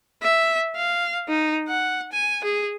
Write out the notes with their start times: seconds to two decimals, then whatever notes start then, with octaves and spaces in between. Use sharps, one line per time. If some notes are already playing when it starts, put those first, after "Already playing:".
0.23 E5
0.76 F5
1.29 D#4
1.68 F#5
2.12 G#5
2.44 G#4